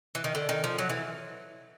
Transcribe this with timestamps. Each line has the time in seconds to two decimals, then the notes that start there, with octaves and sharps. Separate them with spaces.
0.15 E3
0.24 D#3
0.35 D3
0.49 D#3
0.64 F3
0.78 F#3
0.90 E3